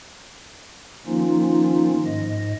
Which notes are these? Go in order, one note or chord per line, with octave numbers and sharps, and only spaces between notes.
D#3 F3 A#3 C#4 D#4 F4
G#2 D#5